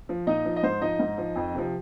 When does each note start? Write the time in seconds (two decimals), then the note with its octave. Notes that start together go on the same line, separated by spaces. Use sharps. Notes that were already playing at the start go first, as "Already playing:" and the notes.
0.09 F3
0.27 A#2 D#4 D#5
0.45 F3
0.56 D#5
0.63 G#2 C5
0.81 F3 D#4 D#5
0.99 G#2
1.18 F3
1.36 F2
1.54 C3 F3